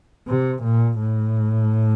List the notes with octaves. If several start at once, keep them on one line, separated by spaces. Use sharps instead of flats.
C3
A#2
A2